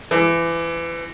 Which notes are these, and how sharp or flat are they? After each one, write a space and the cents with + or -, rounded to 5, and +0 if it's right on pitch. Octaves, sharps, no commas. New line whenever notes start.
E3 +25